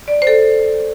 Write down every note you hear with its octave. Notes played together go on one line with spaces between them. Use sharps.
D5
C5
A4